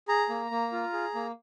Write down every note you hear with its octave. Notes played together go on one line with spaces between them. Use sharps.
G#4 A#5
A#3
A#3
F4
G#4
A#3